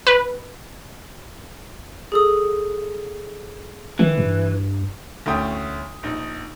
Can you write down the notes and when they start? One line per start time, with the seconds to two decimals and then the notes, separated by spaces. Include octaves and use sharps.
0.07 B4
2.12 G#4 A4 D#6
3.99 D#3 E3
4.18 G2
5.26 D2 A3 C#4 E4 G5 D#6
6.03 A#1 D#4